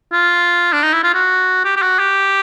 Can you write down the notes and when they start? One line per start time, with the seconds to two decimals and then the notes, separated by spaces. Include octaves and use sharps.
0.12 F4
0.73 D4
0.83 D#4
0.94 E4
1.04 F4
1.14 F#4
1.65 G4
1.76 G4
1.82 F#4
1.99 G4